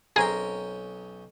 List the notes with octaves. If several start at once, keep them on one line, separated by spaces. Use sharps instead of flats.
B1 C4 C#4 G#4 A#4 G5